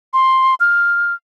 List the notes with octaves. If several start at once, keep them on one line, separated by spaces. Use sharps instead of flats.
C6
F6